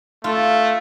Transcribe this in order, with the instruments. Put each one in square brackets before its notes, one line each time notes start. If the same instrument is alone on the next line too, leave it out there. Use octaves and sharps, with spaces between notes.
[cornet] A3 [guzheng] F4